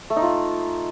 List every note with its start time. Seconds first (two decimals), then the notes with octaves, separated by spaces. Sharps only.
0.10 A3
0.16 D#4
0.22 F4